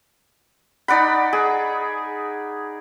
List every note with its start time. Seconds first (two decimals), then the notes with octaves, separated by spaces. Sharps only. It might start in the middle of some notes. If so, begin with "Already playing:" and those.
0.88 D#4 D5 F#5 B5
1.33 G#4